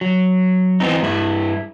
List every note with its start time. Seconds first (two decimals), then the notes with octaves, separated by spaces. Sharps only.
0.01 F#3
0.80 E3 B3 C4 D#4
1.02 G2 E4